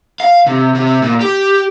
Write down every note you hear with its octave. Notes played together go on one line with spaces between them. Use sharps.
F5
C3
C3
A#2
G4